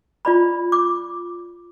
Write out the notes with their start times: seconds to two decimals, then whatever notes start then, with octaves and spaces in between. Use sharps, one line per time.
0.25 F4 D5 B5
0.72 D6